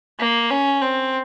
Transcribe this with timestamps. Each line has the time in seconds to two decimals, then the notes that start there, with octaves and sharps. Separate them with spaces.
0.20 A#3
0.50 C#4
0.82 C4